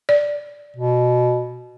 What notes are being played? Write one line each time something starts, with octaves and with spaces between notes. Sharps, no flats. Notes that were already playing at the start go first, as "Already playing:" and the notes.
D5
B2